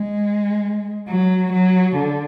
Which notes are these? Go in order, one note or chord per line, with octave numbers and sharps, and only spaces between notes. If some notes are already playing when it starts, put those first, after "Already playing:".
Already playing: G#3
F#3
F#3
D3